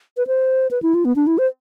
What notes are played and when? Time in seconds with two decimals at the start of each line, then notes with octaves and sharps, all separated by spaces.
0.17 B4
0.27 C5
0.71 B4
0.82 E4
0.94 F4
1.05 B3
1.16 D4
1.27 E4
1.38 C5